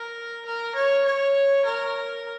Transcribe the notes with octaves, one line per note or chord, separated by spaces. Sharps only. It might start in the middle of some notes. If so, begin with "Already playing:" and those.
Already playing: A#4
A#4
C#5
C#5
A#4